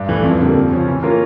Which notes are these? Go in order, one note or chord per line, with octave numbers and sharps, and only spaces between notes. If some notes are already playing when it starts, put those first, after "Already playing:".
Already playing: G2
E3 A3
F2
D3 G3 A#3
F2
C#3 F3 C#4
E3
A#3 C#4 F4 A#4